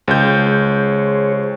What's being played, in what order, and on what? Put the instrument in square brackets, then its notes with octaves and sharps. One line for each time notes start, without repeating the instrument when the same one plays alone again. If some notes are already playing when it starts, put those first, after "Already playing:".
[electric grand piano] C#2 G6 [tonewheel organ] G#4 C5 C#5